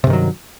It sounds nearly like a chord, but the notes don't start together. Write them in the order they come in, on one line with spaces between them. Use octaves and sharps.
C3 G2 D#3 F#3